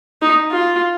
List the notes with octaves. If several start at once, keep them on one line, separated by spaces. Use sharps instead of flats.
D#4
F4